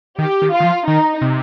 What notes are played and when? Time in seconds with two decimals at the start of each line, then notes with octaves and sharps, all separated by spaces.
0.18 D#3 G4
0.42 D#3
0.53 F4
0.60 D#3
0.64 F3
0.87 D#3 D#4
1.21 C3